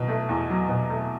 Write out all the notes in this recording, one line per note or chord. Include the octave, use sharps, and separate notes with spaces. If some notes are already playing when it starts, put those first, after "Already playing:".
Already playing: B2 F#3
A3
E2
F#3
B2
A3